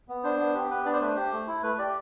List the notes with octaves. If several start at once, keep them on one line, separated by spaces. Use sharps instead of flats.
B3
D4 C5
B3
G4
B3 B4
D4 D5
C5
A3 B4
C5
G4
A3
E4
A3 B4
G4 D5